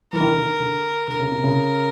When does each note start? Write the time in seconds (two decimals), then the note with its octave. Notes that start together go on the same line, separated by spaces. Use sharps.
0.12 E3 A#4
0.21 D#3
0.29 D3
0.38 D#3
0.60 D3
1.08 D3 A#4
1.20 C#3
1.31 C3
1.44 C#3